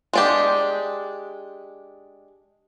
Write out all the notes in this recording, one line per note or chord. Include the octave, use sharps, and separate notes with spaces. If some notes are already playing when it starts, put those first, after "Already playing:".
G#3 D4 G4